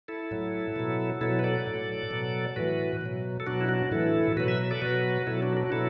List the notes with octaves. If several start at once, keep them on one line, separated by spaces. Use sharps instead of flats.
E4 A4
A2 F#3
B2 F#3
B2 F#3 E4 A4
B4
A4 D5
A2 F#3
B2 F#3
A2 E3 F#4 B4
B2 F#3
A4
B2 F#3 D4 F#4
E4
D4 F#4
A2 E3 E4 A4
B2 F#3 F#4 B4
B4 E5
A4 D5
B2 F#3 F#4 B4
B2 F#3 E4 A4
D4 F#4
D4 F#4
B2 F#3 E4 A4